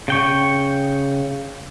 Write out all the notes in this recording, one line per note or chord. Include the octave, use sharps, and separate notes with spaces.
C#3 G5 C#6